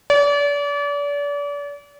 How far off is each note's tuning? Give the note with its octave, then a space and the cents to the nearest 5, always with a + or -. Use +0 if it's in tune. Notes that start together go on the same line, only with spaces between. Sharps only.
D5 -35